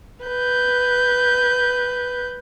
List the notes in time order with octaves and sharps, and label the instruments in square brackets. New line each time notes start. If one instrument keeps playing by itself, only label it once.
[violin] B4 G6